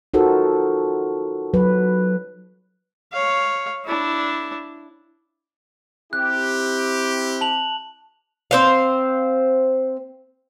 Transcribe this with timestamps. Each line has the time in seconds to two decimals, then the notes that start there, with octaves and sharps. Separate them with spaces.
0.14 D#4 F4 F#4 A4 A#4 C5
1.54 F#3 B4
3.13 C#5 F5
3.85 D4 E4
6.13 C4 E4 G4 F#6
7.41 A5 F7 F#7
8.51 C4 C5 F5